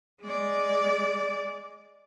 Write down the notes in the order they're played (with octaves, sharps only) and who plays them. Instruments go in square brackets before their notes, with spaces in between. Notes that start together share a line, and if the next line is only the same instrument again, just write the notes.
[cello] G#3 D5